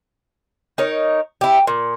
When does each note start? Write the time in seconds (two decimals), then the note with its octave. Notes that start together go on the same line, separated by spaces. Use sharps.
0.78 D#4 A#4 C#5
1.41 E4 G4
1.67 A#2